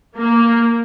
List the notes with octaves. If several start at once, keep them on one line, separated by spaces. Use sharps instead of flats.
A#3